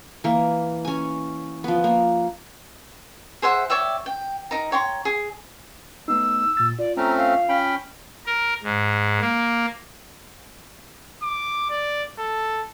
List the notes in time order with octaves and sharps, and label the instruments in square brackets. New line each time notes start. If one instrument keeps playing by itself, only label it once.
[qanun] E3 A#3
C#4 G#5
F3 B3
A#3
[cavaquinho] G#4 C5 E5 F#5
C#5 D5 E5 G5
G5
D#4 A#4 A#5
C#5 G5 A#5 C6
G#4
[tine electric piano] A3 B3 D#4 [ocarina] E6
[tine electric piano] A#2 A6
[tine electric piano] F4 [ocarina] D5
[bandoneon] A3 C4 C#4 [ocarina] A#5
[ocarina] F5
[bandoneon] C#4 G5 B5
[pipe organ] A#4
G#2
A#3
[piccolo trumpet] D6
D5
A4